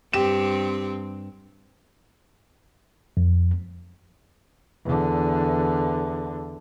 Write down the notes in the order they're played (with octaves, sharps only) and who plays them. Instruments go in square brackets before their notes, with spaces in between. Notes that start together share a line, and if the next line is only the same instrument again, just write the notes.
[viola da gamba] G2 C4 [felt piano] G4 E7
[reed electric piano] F2
[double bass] E2 D3